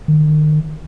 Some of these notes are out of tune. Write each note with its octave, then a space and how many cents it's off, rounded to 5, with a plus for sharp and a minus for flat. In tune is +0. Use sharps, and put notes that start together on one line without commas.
D#3 -35